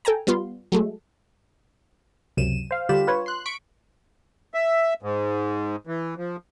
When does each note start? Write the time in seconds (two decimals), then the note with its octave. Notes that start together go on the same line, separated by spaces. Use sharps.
0.05 A4 G5 G#5 A#5
0.27 G3 B3 F4 C6
0.72 F#3 G#3 A3
2.37 C#2 F#2 C3 D#7 E7
2.71 C5 F5
2.89 D3 G3 F4 G4 B5 E7
3.07 F4 B4 C#5
3.26 C6 F#6
3.46 C#6 B6 D7
4.54 E5
5.03 G#2
5.87 E3
6.17 F3